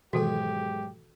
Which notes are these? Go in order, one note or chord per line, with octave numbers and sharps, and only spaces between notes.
B1 G#2 B2 D#3 E3 F#4 G4 A4